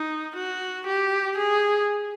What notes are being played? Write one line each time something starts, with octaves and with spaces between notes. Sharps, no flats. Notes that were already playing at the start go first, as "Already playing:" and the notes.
Already playing: D#4
F#4
G4
G#4